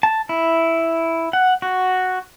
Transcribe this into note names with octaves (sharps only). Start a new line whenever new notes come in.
A5
E4
F#5
F#4